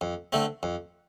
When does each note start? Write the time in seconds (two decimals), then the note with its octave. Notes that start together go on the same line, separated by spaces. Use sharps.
0.01 F2
0.33 D3 A3 C4
0.63 F2